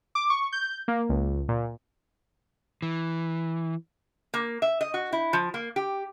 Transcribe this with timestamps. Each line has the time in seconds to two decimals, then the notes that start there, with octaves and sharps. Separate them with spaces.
0.15 D6
0.30 C#6
0.52 G6
0.88 A#3
1.09 C#2
1.48 A#2
2.82 E3
4.34 A#3
4.62 E5
4.81 D#5
4.94 F#4
5.13 E4
5.33 F3
5.54 A#3
5.76 G4